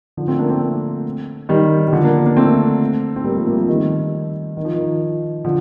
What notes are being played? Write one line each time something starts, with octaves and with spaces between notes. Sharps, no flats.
D3 F3
A3 C4
A#3 D4
A3 C4
D#3 G3
G3
D3 F3
A#3 D4
A#3 D4
A3 C4
C4
G3 A#3
F3 A3
G3 A#3
F3 A3
D#3 G3
D#3
F3
D#3
D3 F3